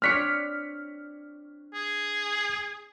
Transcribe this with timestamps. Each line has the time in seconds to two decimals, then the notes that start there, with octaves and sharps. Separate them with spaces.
0.02 C4 D4 C#5 F6 B6 C#7
1.74 G#4